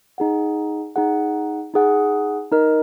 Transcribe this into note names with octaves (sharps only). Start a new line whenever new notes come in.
D#4 G#4 F#5
D#4 G#4 F#5
D#4 G#4 F#5
D#4 A#4 D#5